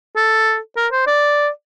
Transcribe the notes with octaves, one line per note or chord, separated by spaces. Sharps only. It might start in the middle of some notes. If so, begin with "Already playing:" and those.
A4
A#4
C5
D5